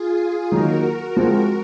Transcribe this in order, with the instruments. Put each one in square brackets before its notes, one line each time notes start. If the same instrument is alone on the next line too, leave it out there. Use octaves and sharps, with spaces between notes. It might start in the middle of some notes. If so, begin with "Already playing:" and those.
Already playing: [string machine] F4 G#4
F4 G#4
[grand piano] D#3 F#3 A#3 D#4 [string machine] F#4 A#4
[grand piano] F3 G#3 C4